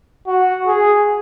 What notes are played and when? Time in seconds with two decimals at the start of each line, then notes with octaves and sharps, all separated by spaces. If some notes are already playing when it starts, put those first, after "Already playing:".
0.27 F#4
0.66 G#4